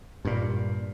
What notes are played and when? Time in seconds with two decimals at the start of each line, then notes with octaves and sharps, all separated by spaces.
0.25 G2 A#2